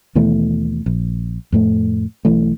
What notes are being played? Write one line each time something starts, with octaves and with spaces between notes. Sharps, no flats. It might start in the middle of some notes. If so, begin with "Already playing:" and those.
D#2 B2 E3 A3
A#1
F2 A2 A3
B1 E3 A3